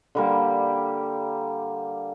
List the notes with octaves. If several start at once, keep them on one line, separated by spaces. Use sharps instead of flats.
D3 G3 A#3